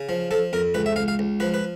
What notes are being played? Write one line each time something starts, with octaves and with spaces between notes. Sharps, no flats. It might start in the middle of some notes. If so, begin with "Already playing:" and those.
Already playing: C#3
F3
F3 A4
F2 A#4
C#2 B4
E5
C#2 F5
F5
C#2
F3 B4
B4